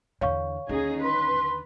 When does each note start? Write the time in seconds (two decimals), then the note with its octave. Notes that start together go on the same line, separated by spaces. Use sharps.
0.21 E2 D3 C#5 F5 C#6
0.69 D#2 D3 C#4 D#4 G#4
1.01 B4 C6